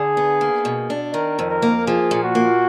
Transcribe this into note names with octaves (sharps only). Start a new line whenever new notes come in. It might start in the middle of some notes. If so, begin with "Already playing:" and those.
Already playing: D3 G#4
B3
A#3
B2
D4
D#3 A#4
F2
A#4
A#3
F3 G#4
A#2
F#4
A#3